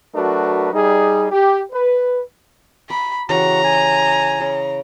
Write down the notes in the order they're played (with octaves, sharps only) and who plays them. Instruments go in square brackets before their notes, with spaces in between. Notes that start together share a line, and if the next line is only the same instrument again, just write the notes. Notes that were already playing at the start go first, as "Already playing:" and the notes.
[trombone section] F#3 A3 D4 F#4 A#4 B4
G3 D#4 G#4
G4
B4
[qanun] A#5 D6 [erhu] B5
[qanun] C#3 E3 G4 [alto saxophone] F#4 [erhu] A#5
[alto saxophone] G#5
[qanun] C#3